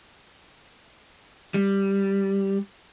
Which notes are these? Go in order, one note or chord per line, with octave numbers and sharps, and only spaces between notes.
G3